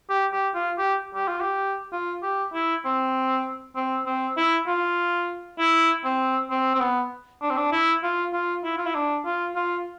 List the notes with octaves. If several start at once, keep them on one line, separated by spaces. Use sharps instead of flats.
G4
G4
F4
G4
G4
F4
G4
F4
G4
E4
C4
C4
C4
E4
F4
E4
C4
C4
C4
B3
D4
C4
D4
E4
F4
F4
E4
F4
E4
D4
F4
F4